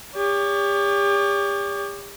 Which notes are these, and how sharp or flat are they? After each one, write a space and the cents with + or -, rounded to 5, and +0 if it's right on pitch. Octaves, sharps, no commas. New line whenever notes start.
G4 +40 C#5 +45